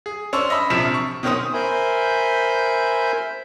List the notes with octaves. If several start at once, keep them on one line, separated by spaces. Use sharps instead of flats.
G#4
C#4 D4 C5 C#6 E6
D#5 E5 B5
A#1 C3 F3 B6 E7
C#6
B2 D#3 C#4 C5 D#6
A#4 C5 E5 G#5 B5 G6